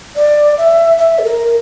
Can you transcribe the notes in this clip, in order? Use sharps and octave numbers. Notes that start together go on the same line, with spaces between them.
D5
E5
E5
A4
A#4